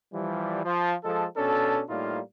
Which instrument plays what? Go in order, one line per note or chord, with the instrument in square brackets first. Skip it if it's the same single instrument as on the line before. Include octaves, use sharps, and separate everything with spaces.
[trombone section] E3 F3 G3
F3
F3 G#3 A4
B2 C#4 D4 A4
A2 G3 A#3 D#4 F4